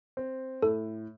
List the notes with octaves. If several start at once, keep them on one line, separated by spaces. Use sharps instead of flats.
C4
A2 A4